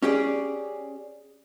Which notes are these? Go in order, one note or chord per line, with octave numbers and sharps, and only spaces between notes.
C#4 G4 G#4 D5